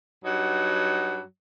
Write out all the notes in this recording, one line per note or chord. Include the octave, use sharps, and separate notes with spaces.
G2 F#3 D#4 F#5